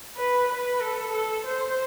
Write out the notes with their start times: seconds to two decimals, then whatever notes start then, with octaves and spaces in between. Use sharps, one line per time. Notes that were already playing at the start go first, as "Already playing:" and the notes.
0.17 B4
0.48 B4
0.80 A4
1.13 A4
1.46 C5